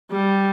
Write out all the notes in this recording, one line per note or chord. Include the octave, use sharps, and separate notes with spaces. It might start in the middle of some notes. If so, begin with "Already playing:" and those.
G3